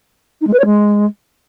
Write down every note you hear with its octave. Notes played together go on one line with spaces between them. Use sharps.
D#4
G#3
B4
C#5
G#3